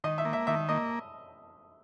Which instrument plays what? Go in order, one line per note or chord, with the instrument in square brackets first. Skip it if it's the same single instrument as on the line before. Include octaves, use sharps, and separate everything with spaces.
[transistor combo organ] D#3 [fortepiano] D#5
[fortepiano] E5
[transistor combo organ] A#3
[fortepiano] E5
[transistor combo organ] D#3 [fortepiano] E5
[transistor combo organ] A#3 [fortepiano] D#5